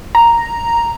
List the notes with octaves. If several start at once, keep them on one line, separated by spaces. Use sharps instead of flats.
A#5